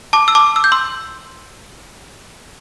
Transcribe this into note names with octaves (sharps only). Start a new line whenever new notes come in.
A5 D6
E6
A5 D6
E6
G6
C6 E6